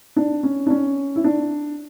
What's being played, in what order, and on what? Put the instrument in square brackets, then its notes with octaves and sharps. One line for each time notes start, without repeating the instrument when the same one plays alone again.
[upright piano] D4
C#4
D4
C#4
E4
D4